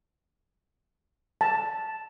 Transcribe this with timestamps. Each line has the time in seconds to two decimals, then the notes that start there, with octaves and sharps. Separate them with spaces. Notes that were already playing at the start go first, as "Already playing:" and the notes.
1.41 A5